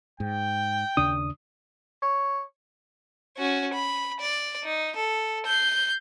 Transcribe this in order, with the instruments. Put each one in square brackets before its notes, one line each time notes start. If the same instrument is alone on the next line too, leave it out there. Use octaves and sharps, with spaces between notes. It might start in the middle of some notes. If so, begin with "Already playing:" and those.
[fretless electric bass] G#2 [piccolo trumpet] G5
[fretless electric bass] D#2 C#3 D4 [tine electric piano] D#6
[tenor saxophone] C#5
[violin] C#4 F#4
B5
D5
D#4
A4
G6 C7